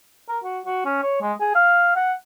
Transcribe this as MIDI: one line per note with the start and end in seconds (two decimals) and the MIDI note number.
0.29 0.38 70
0.44 0.60 66
0.65 0.85 66
0.85 1.01 61
1.03 1.21 73
1.22 1.33 56
1.40 1.52 68
1.55 1.94 77
1.96 2.13 78